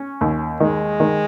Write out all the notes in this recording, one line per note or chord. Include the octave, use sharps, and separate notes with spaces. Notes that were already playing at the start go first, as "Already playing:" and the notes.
Already playing: C#4
D#2
D#3 G#3
D#3